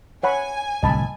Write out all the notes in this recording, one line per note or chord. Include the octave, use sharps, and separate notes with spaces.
C#5 F#5 G#5 B5
D1 C2 C3 D#5 A5 B5